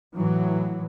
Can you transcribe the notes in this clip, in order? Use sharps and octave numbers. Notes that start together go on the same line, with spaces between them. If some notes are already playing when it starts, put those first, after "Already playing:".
A2 E3 F#3